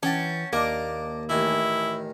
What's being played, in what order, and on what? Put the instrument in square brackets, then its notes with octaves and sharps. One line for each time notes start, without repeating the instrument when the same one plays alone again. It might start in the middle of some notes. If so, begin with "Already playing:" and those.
[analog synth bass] E3 [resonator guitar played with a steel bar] C#4 [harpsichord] F#5 G5 A5
[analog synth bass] D#2 [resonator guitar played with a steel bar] A#3 [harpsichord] D4 D#5
[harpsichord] A1 D#3 G#5 [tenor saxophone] E4